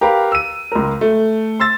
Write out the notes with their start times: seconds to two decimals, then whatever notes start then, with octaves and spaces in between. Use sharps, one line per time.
0.01 G4 A#4 B4 F5
0.32 E6 D#7
0.72 C#2 A#4
1.01 A3
1.60 C6 E6 A6